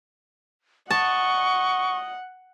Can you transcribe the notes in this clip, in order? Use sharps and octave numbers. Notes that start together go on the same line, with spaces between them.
D#5 F#5 A5 C#6